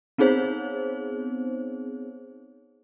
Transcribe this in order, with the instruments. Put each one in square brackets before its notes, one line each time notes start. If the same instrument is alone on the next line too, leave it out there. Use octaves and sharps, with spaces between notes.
[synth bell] B3 C4 D#4 G#4 C5 C#5